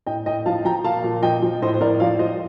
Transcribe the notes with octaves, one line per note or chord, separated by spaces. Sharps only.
A2 D#5 G5
A2 D#5 G5
F3 F5 A5
F3 G5 A#5
A#2 F5 A5
A#2
F3 D#5 G5
F3
A2 C5 D#5
C5
A2 A#4 D5
F3 D5 F5
F3 C5 D#5